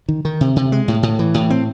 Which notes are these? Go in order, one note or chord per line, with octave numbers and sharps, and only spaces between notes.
D#3
D#3
C3
C3
G#3
A2
A2
E3
A2
C4